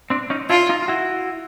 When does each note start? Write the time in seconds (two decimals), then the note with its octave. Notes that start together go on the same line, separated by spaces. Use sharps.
0.10 C4 D4
0.30 C#4 D#4
0.50 D4 E4 F4
0.69 D#4 F4
0.82 F4
0.88 E4 F#4